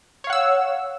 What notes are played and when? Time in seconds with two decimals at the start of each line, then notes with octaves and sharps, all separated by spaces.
0.24 C#5
0.27 F5
0.30 F#5
0.33 E6